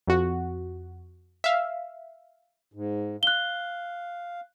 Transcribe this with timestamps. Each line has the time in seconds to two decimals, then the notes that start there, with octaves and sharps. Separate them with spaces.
0.08 F2 F#4
1.44 E5 F5
2.74 G#2
3.23 F5 F#6 G7